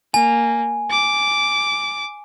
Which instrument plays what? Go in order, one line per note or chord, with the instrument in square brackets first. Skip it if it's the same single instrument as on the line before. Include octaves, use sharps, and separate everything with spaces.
[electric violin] A#3 [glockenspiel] G#5
[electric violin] D6